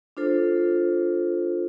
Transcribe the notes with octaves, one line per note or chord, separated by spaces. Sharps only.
D4 F4 A4 C5